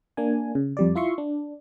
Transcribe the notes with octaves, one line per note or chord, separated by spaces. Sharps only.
A#3 D4 G#5
C#3
F2 G3 D5
E4 F4 E5 C6 C#6
D4